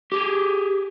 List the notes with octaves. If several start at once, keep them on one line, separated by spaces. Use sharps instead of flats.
G4 G#4